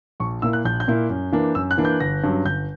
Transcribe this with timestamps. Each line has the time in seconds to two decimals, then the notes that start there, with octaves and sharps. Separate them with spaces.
0.20 A#1 C#6
0.42 A#2 A#3 E4 E6
0.53 F#6
0.64 A#1 G6
0.80 G6
0.88 A#2 A#3 E4
1.09 F#2
1.32 E3 A#3 D4
1.55 F#2 E6
1.71 F#6
1.78 E3 A#3 D4
1.85 G6
2.00 G1 A#6
2.23 G2 F#3 C#4
2.45 G1 G6